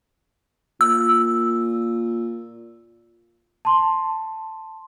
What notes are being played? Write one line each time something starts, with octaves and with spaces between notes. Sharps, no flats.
A#2 E6
A5 C6